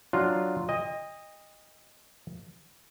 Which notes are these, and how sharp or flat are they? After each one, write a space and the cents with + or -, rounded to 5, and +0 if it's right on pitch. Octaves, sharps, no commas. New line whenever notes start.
F#3 +5 D4 +5 F4 +0
D#5 +0 G5 +45